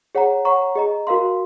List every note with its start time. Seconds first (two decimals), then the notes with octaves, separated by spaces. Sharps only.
0.15 G#4 C#5 F#5 A#5
0.45 C#5 F#5 A#5 C#6
0.75 G#4 D#5 A#5
1.07 F#4 A#4 F5 C6